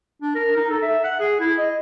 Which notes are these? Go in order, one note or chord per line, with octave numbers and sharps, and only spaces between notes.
D4
A#4
D#4
A4
E5
F#5
G#4
E4
D#5